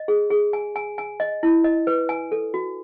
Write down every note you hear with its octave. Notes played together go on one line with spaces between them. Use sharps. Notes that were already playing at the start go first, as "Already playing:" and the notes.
Already playing: D#5
G#4
G#4
G#5
G#5
G#5
D#5
E4
D#5
B4
G#5
A4
F#4